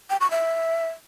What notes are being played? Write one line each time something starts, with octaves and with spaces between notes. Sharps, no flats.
G5
C#6
E5